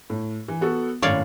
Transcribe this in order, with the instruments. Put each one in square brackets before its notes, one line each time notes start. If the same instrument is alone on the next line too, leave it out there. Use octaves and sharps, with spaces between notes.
[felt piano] A2
E3
B3 F#4 A4
[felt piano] G#1 F#2 A2 [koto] C#5 D5 F5